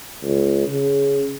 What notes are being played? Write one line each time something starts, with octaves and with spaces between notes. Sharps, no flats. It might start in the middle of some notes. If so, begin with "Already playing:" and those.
C#2
C#3